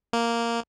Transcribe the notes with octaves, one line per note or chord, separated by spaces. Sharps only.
A#3